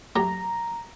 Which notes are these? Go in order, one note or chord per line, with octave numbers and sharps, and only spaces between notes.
F#3 A3 G4 A#5